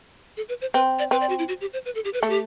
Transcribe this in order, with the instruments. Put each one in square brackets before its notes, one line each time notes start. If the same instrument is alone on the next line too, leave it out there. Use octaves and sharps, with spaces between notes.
[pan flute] A4
B4
C5
[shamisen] C4 [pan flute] B4
[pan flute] D5
[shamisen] C4 [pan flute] B4
[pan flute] D5
F#4
E4
F#4
G4
C5
B4
A4
G4
B4
[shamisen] A3 [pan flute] A4
[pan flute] G4